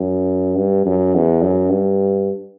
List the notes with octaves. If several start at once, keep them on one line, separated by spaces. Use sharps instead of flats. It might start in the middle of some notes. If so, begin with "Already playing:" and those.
Already playing: F#2
G2
F#2
E2
F#2
G2